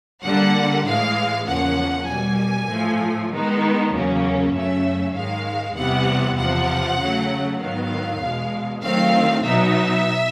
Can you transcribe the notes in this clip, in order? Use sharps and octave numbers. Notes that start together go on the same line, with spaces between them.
D3 G3 A#3 F#5
A2 E3 G#3 F5
E2 C#3 F3 A#3 C#4 F#5
B2 G3 A#3 G#5
A2 F3 A3
D#3 G#3 B3 D#4
E2 C#3 F#3 A#3 C#4
F#2 C#3 F#3 A3 C#4 E5
G#2 D#3 G#3 F5
E2 C3 E3 G3 B3 F#5
E2 C3 F3 F#5
C#3 F#3 A3
G#2 D#3 F#3 B3 F5
E2 B2 G#3
D#3 F#3 A3 C4 F5
B2 F#3 B3 D#4 E5